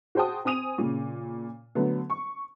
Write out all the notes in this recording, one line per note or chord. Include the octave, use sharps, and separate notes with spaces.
F#4 G#4 C5 G5 A5 D#6
C4 G#5 D#6 D#7 F7
A#2 C#3
D3 F#3 A3 B3
C#6